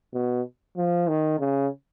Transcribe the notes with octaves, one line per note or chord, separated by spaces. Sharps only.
B2
F3
D#3
C#3